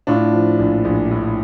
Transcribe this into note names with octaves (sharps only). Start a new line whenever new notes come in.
A2 D4 F4
F3
A#1
A#1
A2